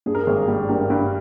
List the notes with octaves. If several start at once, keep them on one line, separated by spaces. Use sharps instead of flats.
G2 G#4
A#4
G#1 G#4
G3
G2 G4 A#4
G2